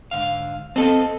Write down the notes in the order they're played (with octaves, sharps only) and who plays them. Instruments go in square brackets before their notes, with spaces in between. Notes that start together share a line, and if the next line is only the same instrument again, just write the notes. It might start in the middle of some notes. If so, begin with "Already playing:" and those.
[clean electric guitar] G#2 D3 F5
[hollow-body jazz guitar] C4 A4 [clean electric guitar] B4 D#5 A5